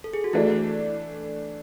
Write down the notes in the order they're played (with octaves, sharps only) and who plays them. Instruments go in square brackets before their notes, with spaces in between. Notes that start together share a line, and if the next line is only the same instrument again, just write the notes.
[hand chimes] A4
G#4
F#4
[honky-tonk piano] E3 A3 D4 [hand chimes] E4